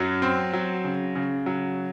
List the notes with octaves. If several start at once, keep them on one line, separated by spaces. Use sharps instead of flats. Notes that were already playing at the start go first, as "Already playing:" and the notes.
Already playing: F#2 F#3
C4
F#3
C#3
C#3
F#3